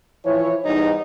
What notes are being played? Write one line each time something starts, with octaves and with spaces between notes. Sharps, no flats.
E3 F3 E4 C#5
E2 G#2 G3 D#4